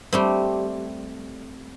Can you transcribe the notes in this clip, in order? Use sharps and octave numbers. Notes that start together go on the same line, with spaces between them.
G3 A3 C4